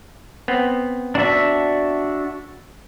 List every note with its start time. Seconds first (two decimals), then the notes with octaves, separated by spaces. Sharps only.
0.48 B3 C4
1.15 D4 F#4 E5